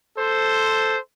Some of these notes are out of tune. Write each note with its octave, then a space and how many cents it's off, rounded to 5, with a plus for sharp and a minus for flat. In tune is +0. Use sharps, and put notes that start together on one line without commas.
A4 +0 C5 +0